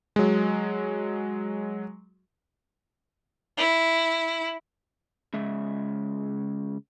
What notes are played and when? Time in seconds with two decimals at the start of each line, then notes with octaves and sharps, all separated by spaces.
0.16 F#3 G#3
3.57 E4
5.34 C#3 G#3 E5